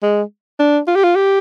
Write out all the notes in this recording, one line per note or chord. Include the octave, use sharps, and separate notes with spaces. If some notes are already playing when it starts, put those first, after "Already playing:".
G#3
D4
F4
G4
F4
G4